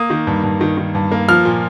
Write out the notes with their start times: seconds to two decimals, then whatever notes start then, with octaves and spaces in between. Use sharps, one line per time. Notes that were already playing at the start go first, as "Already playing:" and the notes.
Already playing: A#3 D#6
0.10 D#3
0.27 G2
0.44 G2
0.61 D#3
0.77 D#3
0.95 G2
1.12 A#3
1.29 F3 F6
1.45 A#2